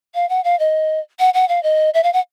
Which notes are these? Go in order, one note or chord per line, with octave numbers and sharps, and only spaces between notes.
F5
F#5
F5
D#5
F#5
F#5
F5
D#5
E5
F5
F#5